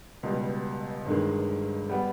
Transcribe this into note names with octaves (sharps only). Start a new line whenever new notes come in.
C#2 B2 G3
G1 G2 D#3 G#3
G3 B3